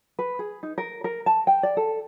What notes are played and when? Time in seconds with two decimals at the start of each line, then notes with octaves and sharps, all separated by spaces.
0.19 B4
0.39 G#4
0.63 D#4
0.78 A#4
1.04 A#4
1.26 A5
1.47 G5
1.63 D5
1.77 A4